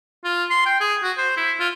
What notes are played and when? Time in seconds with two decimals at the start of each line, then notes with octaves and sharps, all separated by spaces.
0.24 F4
0.50 C6
0.66 G5
0.81 G#4
1.03 F#4
1.18 C5
1.37 E4
1.59 F4